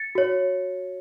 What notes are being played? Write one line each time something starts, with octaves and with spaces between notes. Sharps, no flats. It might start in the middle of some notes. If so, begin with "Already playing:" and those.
Already playing: A6 C#7
F#4 C#5